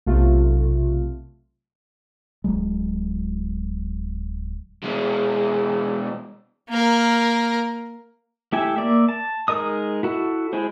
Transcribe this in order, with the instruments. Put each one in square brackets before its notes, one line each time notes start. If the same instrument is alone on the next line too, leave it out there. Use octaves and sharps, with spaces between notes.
[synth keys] B1 C3 A3 F4
[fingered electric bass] D1 A#1 F#3 G#3
[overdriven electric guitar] B2 G#3
[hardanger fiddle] A#3 A#4
[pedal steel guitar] A3 E4 G4 E5 G#5
A#3 D5 E5
A5
G#3 D#4 A#4 D#5 D#6
E4 F#4 A4
G#3 E4 G#4 C5